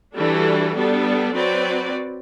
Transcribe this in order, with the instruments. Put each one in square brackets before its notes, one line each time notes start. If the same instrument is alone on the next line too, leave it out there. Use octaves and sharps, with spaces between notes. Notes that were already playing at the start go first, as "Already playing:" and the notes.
[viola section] E3 G3 D4 F#4 A4
G3 B3 D4 A4
F#3 C4 F#4 B4 D5